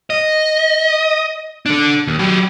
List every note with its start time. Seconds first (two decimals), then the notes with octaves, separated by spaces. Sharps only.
0.10 D#5
1.66 D4 A4
2.07 D#2
2.19 F#3 G4